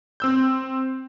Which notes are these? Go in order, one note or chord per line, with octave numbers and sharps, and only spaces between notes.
C4 E6 G6